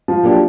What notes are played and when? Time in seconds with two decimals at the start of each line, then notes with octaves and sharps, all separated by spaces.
0.08 F3
0.23 F#3 A#3 D4 G4